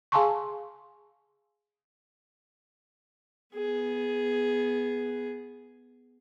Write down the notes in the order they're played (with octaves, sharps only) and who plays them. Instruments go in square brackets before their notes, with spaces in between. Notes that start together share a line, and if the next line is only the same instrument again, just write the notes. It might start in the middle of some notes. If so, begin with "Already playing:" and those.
[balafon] G#4 F5 G#5 A5 C6 C#6
[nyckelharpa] B3 G#4